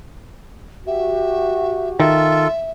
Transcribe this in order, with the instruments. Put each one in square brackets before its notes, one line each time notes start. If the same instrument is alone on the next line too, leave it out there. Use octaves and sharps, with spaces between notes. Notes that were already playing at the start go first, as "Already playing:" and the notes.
[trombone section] F#4 G4 [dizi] E5
[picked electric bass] D#3 [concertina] F4 A4 [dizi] E5